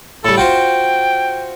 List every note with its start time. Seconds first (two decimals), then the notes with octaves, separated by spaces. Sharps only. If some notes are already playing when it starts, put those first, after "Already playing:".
0.25 A2 G3 A4
0.38 F4 F#4 C5 G5